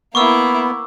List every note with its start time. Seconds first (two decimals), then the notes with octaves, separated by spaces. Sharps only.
0.15 A#3 B3 E4 B5 C#6 D6 E6